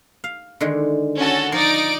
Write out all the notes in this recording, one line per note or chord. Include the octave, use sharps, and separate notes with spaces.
F5
D3 D#3 G#3
C#4 F#4 A4
F3 D#4 D5 D7